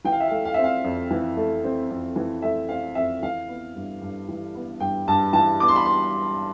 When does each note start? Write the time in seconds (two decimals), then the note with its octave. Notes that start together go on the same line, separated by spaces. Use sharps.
0.04 E3 G5
0.12 F5
0.20 E5
0.28 A3 F5
0.45 F5
0.54 C4 E5
0.64 F5
0.84 F2
1.11 E3
1.37 A3
1.64 C4
1.90 F2
2.16 E3
2.42 A3 E5
2.69 C4 F5
2.95 F2 E5
3.22 E3 F5
3.48 B3
3.76 G2
4.01 G2
4.28 E3
4.55 B3
4.80 G2 G5
5.08 G2 A5
5.33 E3 A5
5.60 B3 D6
5.68 C6
5.76 B5
5.85 C6